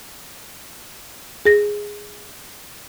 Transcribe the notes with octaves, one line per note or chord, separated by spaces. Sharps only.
G#4 A#6